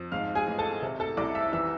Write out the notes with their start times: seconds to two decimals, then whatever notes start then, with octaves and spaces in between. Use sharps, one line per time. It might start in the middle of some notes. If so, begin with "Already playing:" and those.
Already playing: F2
0.12 G#2 F5 F6
0.35 G#4 G#5
0.47 A1
0.58 A4 A5
0.82 C3
1.00 A4 A5
1.17 C2 D5 D6
1.35 E5 E6
1.52 E3 E5 E6